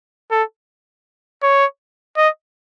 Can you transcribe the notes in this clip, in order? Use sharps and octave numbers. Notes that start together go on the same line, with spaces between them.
A4
C#5
D#5